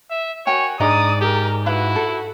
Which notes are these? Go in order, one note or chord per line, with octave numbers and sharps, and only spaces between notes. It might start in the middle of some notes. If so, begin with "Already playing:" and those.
E5
F#4 A#4 C#5 G5 G#5
G#2 D4 D5 D#5 A#5 D#6
G4 G#4 A#4
E4 F#4 B4 F5
A4